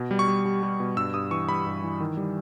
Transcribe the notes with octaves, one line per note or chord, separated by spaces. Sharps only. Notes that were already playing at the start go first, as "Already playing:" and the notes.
Already playing: B2
G3
C#6
G3
G3
G3
B2
G2 E6
G2 D#6
E3 C#6
G3 B5
G2
E3
D#3
G3